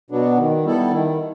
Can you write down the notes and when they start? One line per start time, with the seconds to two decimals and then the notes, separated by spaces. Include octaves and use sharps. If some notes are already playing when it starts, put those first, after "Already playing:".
0.11 B2 F#3 B3 D4
0.37 D#3
0.64 G3 B3 E4 A4
0.91 D#3